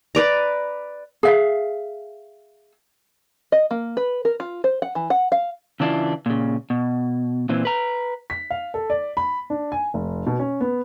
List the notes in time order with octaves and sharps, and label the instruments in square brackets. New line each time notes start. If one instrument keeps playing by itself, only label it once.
[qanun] B4 D5 A#5
[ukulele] G#4 E5 F5
[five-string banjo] D#5
A#3
B4
A#4
F4
C5
F#5
E3
F#5
F5
[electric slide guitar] C#3 E3 D4 E4 F4
A#2 C#3
B2
A#2 E3 C4
B4 A#5
[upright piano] B6
F5
A4
D5
B5
D4
G#5
F1
B2
C#4
B3